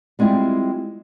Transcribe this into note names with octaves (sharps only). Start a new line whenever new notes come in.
G3 G#3 C4 E4 F4